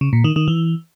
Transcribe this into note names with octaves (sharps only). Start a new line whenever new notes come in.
C#3
A#2
D#3
D#3
E3